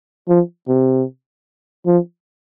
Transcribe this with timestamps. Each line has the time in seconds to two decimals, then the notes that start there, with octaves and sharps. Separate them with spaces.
0.28 F3
0.68 C3
1.86 F3